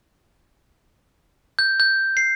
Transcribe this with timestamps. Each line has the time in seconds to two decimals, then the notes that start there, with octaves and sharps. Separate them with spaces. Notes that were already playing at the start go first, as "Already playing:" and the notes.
1.59 G6
1.80 G6
2.17 C7